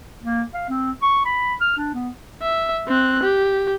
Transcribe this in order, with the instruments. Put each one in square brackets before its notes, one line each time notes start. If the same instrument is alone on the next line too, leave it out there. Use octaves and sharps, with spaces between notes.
[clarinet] A#3
F5
C4
C#6
B5
F6
D4
B3
[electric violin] E5
C4 F#6
G4